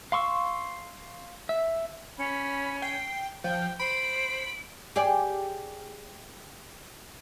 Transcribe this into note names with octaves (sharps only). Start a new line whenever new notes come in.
F5 C6 C#6 E6
E5
C#4 B5
G5 C7
F3 G5 G6
C5 B5 D7
G4 G#4 D5